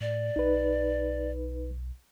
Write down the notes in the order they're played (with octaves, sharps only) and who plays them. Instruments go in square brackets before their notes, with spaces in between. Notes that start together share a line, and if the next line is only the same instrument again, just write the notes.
[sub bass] A2 [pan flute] D5
[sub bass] B1 [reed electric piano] D#4 B4